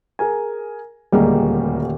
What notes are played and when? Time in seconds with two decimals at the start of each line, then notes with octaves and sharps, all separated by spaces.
0.19 G#4 A#4 G#5
1.12 D#1 D2 G3 G#3 A#3 G4